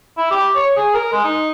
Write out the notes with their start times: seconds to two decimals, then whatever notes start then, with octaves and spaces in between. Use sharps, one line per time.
0.18 E4
0.31 G4
0.55 C#5
0.77 G#4
0.94 A#4
1.12 G#3
1.24 D#4